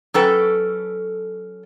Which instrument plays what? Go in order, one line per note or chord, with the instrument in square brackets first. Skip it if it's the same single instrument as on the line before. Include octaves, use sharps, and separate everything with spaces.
[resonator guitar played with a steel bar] F#3 C#4 A4 B4 G5